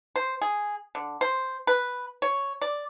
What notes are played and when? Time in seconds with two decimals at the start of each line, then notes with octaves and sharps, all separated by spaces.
0.16 C5
0.41 G#4
0.95 D3
1.21 C5
1.67 B4
2.22 C#5
2.62 D5